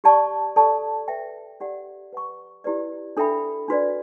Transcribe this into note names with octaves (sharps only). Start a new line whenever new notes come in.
G4 D5 A5 C#6
A4 D5 A5 C#6
B4 E5 G5
G4 D5 F#5
B4 F#5 C#6
E4 G4 B4 D5
D4 A4 E5 G5 B5
D4 F#4 B4 D5